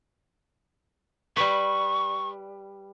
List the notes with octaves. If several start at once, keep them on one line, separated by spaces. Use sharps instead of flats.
G3 B4 C#6